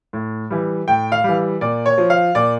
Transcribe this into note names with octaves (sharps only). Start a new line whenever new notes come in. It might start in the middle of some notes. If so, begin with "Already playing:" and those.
A2
E3 G3
A2 G5
F5
E3 G3
A#2 D5
C#5
F3
F5
A#2 D5